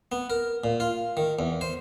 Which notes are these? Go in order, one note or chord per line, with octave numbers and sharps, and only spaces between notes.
B3
A#4
A#2
F4
D#3
E2
C5